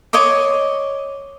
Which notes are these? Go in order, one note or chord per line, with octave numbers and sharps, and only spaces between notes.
C#5 D#5 C6 D6